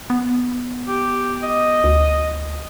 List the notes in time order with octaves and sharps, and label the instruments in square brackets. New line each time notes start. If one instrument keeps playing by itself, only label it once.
[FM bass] B3
[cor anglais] G4
D#5
[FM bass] D2